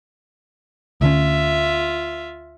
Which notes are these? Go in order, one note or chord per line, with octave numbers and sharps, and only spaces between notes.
D2 D3 C#4 F4 E5